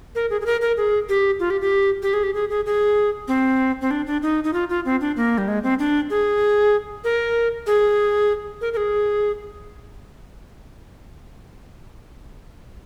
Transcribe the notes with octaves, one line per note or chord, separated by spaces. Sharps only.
A#4
G#4
G#4
A#4
A#4
G#4
G4
F4
G4
G4
G4
G#4
G4
G#4
G#4
G#4
C4
C4
D4
D4
D#4
D#4
F4
F4
C4
D4
A#3
G3
G#3
C4
D4
G#4
A#4
G#4
A#4
A#4
G#4